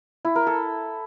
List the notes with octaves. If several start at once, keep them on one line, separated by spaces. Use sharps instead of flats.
E4
A#4
A4